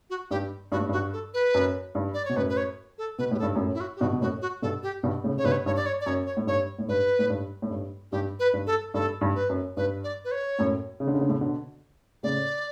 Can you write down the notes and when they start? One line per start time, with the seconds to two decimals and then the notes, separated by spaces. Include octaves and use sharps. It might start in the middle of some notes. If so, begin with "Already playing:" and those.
0.10 F#4
0.31 G2 G4
0.72 G2 F#4
0.80 A2
0.89 G2 F#4
1.13 A4
1.34 B4
1.54 F#2
1.95 G2
2.14 D5
2.25 B2 C#5
2.36 F#2 A2 B4
2.49 B4
2.57 C#5
2.98 A4
3.18 B2 B4
3.31 A2 G4
3.39 A4
3.42 G2
3.55 F#2 A2
3.74 E4
3.80 F#4
3.96 G4
4.01 G2 B2 F#4
4.12 B2
4.21 F#2 A2 F#4
4.42 F#4
4.62 G2 B2 A4
4.83 G4
5.03 G2 B2
5.24 A2 C#3
5.37 C#3 C#5
5.44 G2 B2 B4
5.52 C#5
5.65 G2 C#5
5.76 D5
5.86 C#5
6.01 D5
6.06 F#2 C#5
6.26 C#5
6.37 A2
6.47 G2 C#5
6.79 A2
6.88 G2 B4
7.19 A2
7.30 G2
7.62 A2
7.71 G2
8.12 G2 G4
8.39 B4
8.53 G2
8.67 A4
8.94 G2 A4
9.21 G2
9.35 B4
9.49 F#2
9.77 G2 B4
10.04 D5
10.25 B4
10.31 C#5
10.59 F#2 A2
11.00 C#3
11.07 D3
11.14 C#3
11.21 D3
11.29 A2 C#3
11.41 B2 D3
12.23 A2 C#3 D5